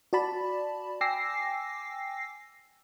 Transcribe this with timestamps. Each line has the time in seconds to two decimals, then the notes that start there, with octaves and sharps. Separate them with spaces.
0.13 F#4 D5 A5 B5
1.01 G5 G#5 D6 E6 A#6 C7